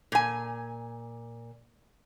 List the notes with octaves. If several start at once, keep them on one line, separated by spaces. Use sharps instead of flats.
A#2 G#5